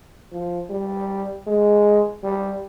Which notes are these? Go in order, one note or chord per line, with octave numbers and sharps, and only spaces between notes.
F3
G3
G#3
G3